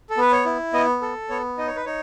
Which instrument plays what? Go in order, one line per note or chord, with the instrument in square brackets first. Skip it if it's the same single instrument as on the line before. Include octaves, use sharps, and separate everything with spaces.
[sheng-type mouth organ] A4
B3 B4
C#5
E4
B3 D#5
A4
B3 C#5
D#4 D#5
C#5
B4
D#4 C#5